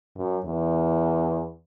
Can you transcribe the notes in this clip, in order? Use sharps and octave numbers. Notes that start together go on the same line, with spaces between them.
F#2
E2